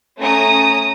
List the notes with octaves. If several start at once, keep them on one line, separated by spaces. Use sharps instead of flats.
A3 C#4 A#5 D#6